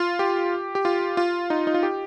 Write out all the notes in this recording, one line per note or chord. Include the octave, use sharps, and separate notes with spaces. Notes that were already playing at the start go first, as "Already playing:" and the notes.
Already playing: F4
G4
G4
F4
F4
D#4
D#4
F4
G4